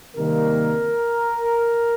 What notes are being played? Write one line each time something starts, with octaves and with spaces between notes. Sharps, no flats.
C3 D#3 G3 A#3 A#4